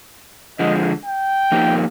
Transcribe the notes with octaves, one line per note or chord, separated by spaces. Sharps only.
D3 F3 G#3 D#5
G5
F3 A#3 D#4 G4